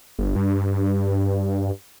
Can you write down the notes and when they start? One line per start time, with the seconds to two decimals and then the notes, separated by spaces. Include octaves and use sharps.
0.19 G1
0.36 G2